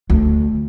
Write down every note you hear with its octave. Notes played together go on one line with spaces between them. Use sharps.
D2